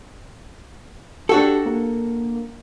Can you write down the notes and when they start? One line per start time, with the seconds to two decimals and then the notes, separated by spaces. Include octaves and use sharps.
1.29 D4 F#4 G4 A4
1.66 A#3